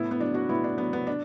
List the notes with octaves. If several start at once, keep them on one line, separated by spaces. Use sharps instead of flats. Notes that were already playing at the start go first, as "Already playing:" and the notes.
Already playing: A2 B3 E4
B3
F#3 D4
D4 F#4
A2 B3 E4
D4
F#3 B3
B3
D4